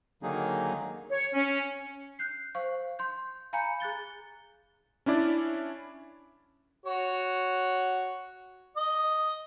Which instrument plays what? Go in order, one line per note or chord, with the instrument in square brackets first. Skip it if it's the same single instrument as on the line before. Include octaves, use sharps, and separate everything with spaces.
[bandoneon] D3 D#3 F#3 A#3 D#4 G#4
[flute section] C#5
C#4
[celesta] F#6 G6 C7
C5 F5 C#6
C6 G6
F5 G#5 A#5 B5 G6 C#7
G#4 F#6 A6 G7
[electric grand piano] C#4 D4 E4 D5
[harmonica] F#4 C#5
D#5